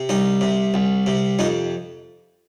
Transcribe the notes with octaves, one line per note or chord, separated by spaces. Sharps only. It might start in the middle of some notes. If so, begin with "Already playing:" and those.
Already playing: C3
C2 D#4
C3
C2
C3
F2 D#4